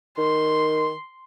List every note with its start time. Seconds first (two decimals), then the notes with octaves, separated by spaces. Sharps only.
0.18 D#3 C6